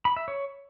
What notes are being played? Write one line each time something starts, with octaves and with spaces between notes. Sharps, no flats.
B5
E5
C#5